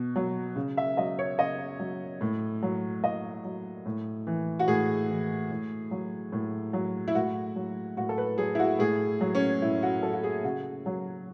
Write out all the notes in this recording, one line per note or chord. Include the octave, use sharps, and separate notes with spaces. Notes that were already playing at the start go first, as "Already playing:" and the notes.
Already playing: B2
F#3
C#3
E5
F#3 D#5
C#5
C#3 D#5
F#3
A2
F#3
A2 D#5
F#3
A2
E3
F#4
A2 G#4
E3
A2
F#3
A2
F#3
E4
A2 F#4
F#3
A2 F#4
A4
B4
F#3 G#4
E4
F#4
A2 G#4
F#3
C#4
A2 E4
F#4
F#3 A4
F#4
G#4
C#3 F#4
F#3